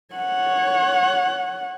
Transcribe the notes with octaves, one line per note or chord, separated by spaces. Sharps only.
C#5 F#5